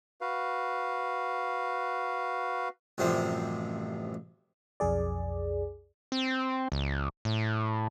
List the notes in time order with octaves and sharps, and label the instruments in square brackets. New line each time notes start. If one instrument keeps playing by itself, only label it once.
[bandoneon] F#4 B4 F5
[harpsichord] A1 F#2 C3 F3 G3 C5
[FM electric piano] B1 F2 G#4 D5
[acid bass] C4
C#2
A2